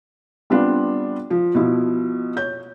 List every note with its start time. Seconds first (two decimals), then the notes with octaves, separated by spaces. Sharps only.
0.50 G3 B3 C4 D4 F4
1.30 F3
1.55 B2 F3 E4
2.36 C#5 G6